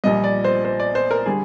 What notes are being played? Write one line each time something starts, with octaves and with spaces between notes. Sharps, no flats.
A#1 A#2 G3 D#5
D5
C5
C5
D5
C5
A#4
D3 G3 G#4